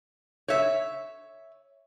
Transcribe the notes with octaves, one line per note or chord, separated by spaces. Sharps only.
C#5 E5